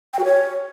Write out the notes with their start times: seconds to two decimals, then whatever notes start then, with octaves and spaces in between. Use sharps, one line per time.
0.13 G5
0.19 F#4
0.25 C#5